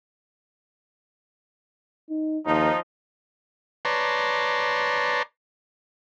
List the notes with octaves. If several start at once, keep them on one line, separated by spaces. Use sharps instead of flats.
D#4
D#2 F3 D#4
B4 C#5 D5 A5 A#5 C6